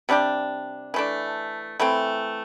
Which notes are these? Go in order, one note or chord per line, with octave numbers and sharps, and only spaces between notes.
C3 G3 D4 G4
E3 A3 D4
E3 A3 C4